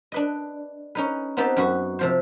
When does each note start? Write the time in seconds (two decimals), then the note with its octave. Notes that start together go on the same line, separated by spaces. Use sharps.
0.12 D4 B4 D#5
0.95 C#4 D#4 B4
1.37 B3 C4 D#4 G4 B4 A5
1.56 F#2 F#4 B4
1.99 C3 F3 C5